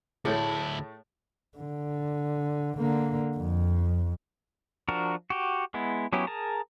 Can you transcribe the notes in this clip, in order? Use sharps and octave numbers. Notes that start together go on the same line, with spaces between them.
D2 A2 A3 E4 G#4 C#5 A5
D3
D3 A#3
F2
F3 D4 F#4 A#4
F#4 G4
G#3 B3 E4
F#3 B3 C#4 E4 G4
G#4 A#4 A5 A#5